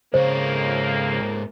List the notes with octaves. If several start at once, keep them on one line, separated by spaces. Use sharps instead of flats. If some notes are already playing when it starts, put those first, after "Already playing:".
F2 G#2 C#3 A#3 C5 C#5